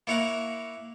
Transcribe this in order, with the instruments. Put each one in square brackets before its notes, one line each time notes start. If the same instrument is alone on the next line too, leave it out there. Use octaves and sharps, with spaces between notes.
[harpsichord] A#3 E4 C#5 F5 F#5 A#5